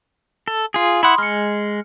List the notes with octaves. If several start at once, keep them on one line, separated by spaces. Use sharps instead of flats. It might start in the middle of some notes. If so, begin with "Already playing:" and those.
A4
F4 G#4
E4 F#5 B5 C6 D#6
G#3 F6 C#7